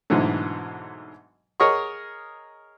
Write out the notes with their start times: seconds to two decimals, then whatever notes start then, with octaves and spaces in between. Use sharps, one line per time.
0.10 G#2 B2 D3 E3 F#3 A3
1.60 G#4 A#4 C#5 D#5 F#5 C#6